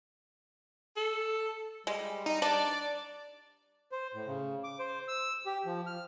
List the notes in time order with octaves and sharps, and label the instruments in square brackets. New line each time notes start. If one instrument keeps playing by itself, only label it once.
[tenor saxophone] A4
[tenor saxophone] G3 [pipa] G#3
[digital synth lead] D#4
[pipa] D4 [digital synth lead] D5
[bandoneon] C5
A2
C#3
D6
C5
E6
G4
F3
F6